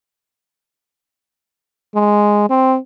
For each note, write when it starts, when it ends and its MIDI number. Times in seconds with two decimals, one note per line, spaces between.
1.95 2.45 56
2.50 2.77 60